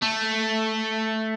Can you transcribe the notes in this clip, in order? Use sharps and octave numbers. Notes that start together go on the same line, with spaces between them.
A3